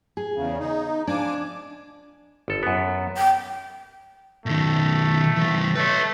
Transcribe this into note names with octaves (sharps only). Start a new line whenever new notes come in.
G#4
E2 C#3
D#4
F3 D4 G#5 D6
G1 A4
F#2 B3
G5
B2 D#3 A3
E3 G3
A3 B4 C#5